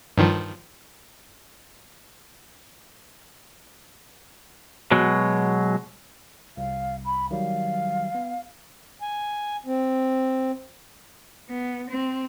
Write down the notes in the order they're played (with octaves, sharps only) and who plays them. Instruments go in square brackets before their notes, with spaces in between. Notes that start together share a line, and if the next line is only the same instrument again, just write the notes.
[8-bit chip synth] G2 D#3 F3
[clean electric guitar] B2 F#3 G#3
[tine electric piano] C2 [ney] F5
[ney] B5
[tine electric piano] D#3 F#3 G3 [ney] F5
[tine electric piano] B3
[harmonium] G#5
C4
[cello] B3
C4